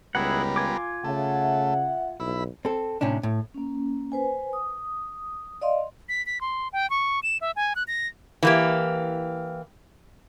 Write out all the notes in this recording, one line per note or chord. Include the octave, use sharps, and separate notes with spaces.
C#2 G3 B3 E4 G#4 A#4 F#5
F4 G#5 D6
C#3 A3 E5 F#5
B1 E4 B5
C4 A4
A2 C3 C#4 D4
A2
A#3 C#4
B4 C5 G#5
D#6
D5 D#5 F5 C6
B6
B6
C6
G5
C#6
E7
E5
G#5
F#6
A#6
E3 A#3 G4